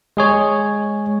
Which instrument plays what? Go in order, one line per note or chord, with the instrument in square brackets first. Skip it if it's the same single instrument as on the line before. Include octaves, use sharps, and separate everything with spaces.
[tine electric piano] G#3 G#4 C#5